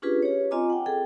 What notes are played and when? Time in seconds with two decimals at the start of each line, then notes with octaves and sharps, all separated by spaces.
0.02 C#4 D4 F4 G4 G#4 B4
0.22 G4 C#5
0.51 C4 F4 D#5 G#5 A#5 D6
0.70 F#5 G5
0.86 G#4 A4 G5